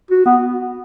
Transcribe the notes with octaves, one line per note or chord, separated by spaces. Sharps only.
F#4
B3